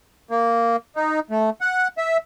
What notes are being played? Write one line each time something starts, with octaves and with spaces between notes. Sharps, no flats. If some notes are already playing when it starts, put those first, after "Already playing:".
A#3
D#4
A3
F#5
E5